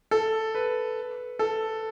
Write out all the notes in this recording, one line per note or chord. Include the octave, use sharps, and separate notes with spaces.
A4
B4
A4